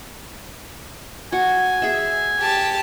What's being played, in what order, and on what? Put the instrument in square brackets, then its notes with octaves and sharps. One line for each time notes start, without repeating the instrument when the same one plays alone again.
[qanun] F#4 [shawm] G#5
[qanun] G#4 E5
[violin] G4 A5